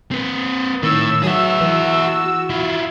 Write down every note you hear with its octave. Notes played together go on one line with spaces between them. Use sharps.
C4 B4
A2 D#3 E6
F#3 F#4 G#4 E5
E3
E4 F4